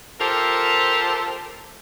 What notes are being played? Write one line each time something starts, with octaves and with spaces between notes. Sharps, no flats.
F4 G4 A4 A#4 C5